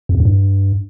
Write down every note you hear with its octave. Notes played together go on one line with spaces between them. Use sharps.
F2
E2
F#2
G2